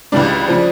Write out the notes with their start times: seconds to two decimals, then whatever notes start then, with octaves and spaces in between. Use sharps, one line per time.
0.12 C#2 C#3 E3 G3 D4 D5
0.48 C#3 F3